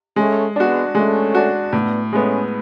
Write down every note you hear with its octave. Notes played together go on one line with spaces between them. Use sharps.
G#3 A3 C#4
G#3 B3 D4 F#4
G#3 A3 C#4
D4 F#4
A2 B3 D4
G#3 A3 B3 C#4